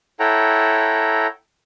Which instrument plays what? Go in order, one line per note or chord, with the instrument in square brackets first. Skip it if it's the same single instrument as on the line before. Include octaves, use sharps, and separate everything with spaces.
[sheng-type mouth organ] E4 A4 C#5 F#5 G5 A#5